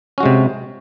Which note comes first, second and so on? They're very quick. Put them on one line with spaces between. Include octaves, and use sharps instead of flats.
C#4 F#4 G#3 C3